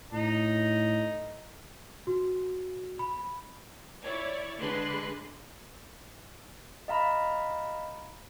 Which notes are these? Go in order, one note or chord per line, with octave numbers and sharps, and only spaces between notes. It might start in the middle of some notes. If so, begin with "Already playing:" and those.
A2 D#4
F#4
B5
E4 C#5 D5
D3 G#3 D4 B4 C6 F#6
D#5 F5 A#5 B5